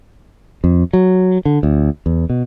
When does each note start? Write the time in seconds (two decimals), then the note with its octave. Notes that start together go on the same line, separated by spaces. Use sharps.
0.64 F2
0.93 F#3
1.45 D3
1.63 D2
2.06 E2
2.30 B2